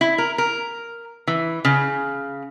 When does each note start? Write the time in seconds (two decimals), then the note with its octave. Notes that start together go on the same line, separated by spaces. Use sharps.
0.01 E4
0.18 A#4
0.38 A#4
1.28 E3
1.65 C#3